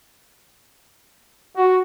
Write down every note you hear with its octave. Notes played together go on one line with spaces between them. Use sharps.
F#4